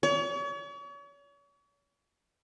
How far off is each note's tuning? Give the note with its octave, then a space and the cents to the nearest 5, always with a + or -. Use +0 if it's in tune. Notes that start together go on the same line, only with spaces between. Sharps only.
C#5 +40